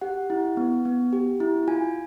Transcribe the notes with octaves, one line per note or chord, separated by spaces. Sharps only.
G4 F#5
E4
B3
B3
G4
E4
F4 G#5